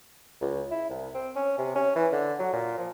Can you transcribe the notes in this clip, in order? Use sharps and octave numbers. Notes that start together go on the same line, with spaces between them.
C#2
E4
C2
C4
C#4
C3
C#4
E3
D3
F#3
A#2
F3